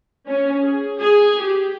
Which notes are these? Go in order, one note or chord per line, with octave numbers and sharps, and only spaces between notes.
C#4
G#4
G#4
G4